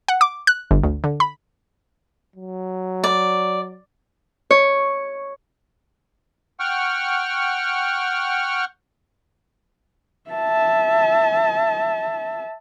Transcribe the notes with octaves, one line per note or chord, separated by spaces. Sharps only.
F#5
D6
F#6
G1
D2
D3
B5
F#3
D5
C#5
F#5 G5 C#6 F6
E5 A5